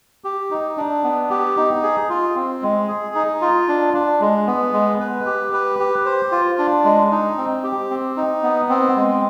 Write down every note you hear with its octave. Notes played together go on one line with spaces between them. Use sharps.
G4
D#4
D4
B3
G4
D#4
G#4
F4
C4
G#3
G#4
D#4
F4
D4
D4
G#3
B3
G#3
B4
G4
B4
G4
C5
F4
D4
G#3
D#4
C4
G4
C4
D#4
B3
C4
G#3